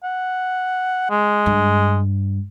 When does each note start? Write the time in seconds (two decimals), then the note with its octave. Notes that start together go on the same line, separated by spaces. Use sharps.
0.03 F#5
1.10 G#3
1.46 G2